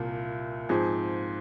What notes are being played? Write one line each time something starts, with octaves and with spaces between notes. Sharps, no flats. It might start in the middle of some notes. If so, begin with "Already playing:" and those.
Already playing: C2 A#2 A#3
G#2 F3 C4 G#4